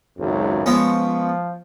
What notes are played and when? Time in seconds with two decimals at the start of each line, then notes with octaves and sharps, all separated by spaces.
0.19 G#1 C#2 F#2
0.66 F3 G#3 B3 C#4